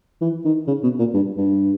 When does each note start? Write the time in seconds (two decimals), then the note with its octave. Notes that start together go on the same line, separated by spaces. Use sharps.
0.21 E3
0.45 D#3
0.67 C#3
0.83 B2
0.99 A#2
1.14 G2
1.37 G2